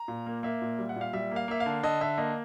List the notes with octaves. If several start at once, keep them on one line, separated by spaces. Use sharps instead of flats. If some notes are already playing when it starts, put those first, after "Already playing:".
Already playing: A#5
A#2
A#3
A#3 E5
A#2
G3
F#5
A#2 F5
G3 E5
A#3 F5
A#3 E5
F5
D3
D3 D#5
D3 E5
A#3 D#5